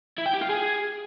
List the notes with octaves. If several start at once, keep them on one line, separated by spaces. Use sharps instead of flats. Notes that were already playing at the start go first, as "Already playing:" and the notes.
E4
G5
G4
F4
G#4